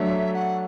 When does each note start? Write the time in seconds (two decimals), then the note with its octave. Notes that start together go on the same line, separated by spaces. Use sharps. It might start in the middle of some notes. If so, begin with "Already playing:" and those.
Already playing: F#3 A3 D4 A4 C#5 E5
0.34 F#5